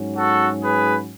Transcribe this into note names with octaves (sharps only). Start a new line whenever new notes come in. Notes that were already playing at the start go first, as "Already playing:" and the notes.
Already playing: G#2 F#3 C#4
F#4 A4
G#4 B4